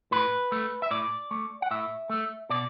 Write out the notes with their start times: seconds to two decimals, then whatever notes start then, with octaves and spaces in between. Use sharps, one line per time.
0.11 A2 B4
0.52 A3
0.82 E5
0.91 A2 D5
1.31 A3
1.62 F#5
1.71 A2 E5
2.10 A3
2.50 B2 D5